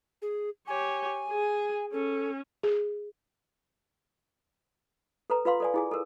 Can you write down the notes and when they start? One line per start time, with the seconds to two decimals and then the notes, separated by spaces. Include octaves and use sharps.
0.22 G#4
0.67 G4 C#5 G#5
1.29 G#4
1.92 C#4 A4
2.63 G#4
5.30 A4 B4 A#5
5.45 F4 B4 F5 C6
5.60 A4 D5 G#5
5.74 E4 G#4 G#5
5.91 A4 A#4